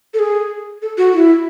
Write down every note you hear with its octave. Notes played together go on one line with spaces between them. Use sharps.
A4
G#4
A4
F#4
E4